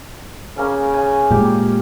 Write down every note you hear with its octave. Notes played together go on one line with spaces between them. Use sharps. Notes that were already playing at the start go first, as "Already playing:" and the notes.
C#3 A#3 C#4
G#5
A#2 G#3 G4